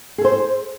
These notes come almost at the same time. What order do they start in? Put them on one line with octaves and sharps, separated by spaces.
G#4 A4 C5